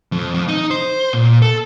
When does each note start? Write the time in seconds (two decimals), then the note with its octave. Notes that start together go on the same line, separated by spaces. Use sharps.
0.12 F2
0.34 F2
0.48 D#4
0.71 C5
1.13 A#2
1.42 A4